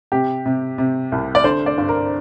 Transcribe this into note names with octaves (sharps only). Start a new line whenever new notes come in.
C3 G4
C3
C3
C2
D5
D3 C5
D5
G2
A#4